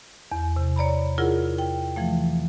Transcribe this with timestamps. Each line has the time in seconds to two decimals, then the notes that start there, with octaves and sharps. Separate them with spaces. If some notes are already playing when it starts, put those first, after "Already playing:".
0.32 E2
0.56 C3
0.76 C#5 D5 A#5 B5
1.18 E4 F4 G#4 A#4 F#5
1.58 G5
1.96 E3 F3 A3